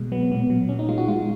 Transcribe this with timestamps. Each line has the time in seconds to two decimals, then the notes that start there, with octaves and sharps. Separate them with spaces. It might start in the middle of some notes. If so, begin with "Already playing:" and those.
Already playing: B2 G#3
0.12 F#3 B3
0.31 A#2 B3
0.50 F#3
0.69 A#2 C#4
0.79 D#4
0.89 G#3 F4
0.98 F#4
1.08 G#3 F4